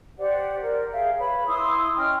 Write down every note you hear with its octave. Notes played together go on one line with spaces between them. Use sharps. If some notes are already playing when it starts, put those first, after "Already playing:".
G4 C5 D5 F#5
A#4 D5
G#4 E5 F5 G5
B4 C#5 B5
E4 C6 D#6 E6
C#4 D#5 G5 F6